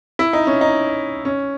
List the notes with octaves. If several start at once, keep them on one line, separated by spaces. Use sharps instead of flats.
E4
D#4
C#4
D#4
C#4